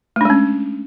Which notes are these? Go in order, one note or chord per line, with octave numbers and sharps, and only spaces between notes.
G#3 A3 C#4 D4